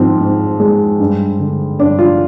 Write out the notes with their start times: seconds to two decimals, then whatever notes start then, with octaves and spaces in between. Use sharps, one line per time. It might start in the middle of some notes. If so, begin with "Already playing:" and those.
Already playing: G#2 F3 C4
0.21 G#2
0.60 G#3
1.00 G2
1.39 D3
1.80 G2 D4
1.99 F4